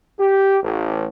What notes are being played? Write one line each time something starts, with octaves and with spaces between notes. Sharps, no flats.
G4
A1